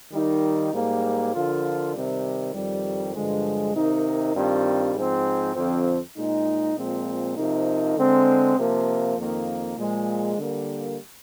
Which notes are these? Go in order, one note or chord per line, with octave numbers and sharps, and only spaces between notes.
D#3 G3 A#3 D#4
G#2 G3 A#3
D3 F3 A#3 F4
C3 D#3 G3
F2 D#3 G3
G2 D3 F3 G#3
C3 D#3 A#3 D#4
G2 D#3 G3 C4 F4
G#2 F3 C4
F2 D3 F3 C4
A#2 G#3 D#4
A#2 F3 G#3 C4
C3 F3 A#3 D#4
D3 G#3 C4
C3 F3 A#3
F2 D#3 A#3
A#2 F3 G#3
D3 G3 A#3